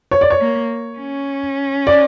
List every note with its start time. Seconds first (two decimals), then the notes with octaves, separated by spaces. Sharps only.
0.11 C#5
0.21 D5
0.30 C#5
0.40 A#3
0.99 C#4
1.87 D5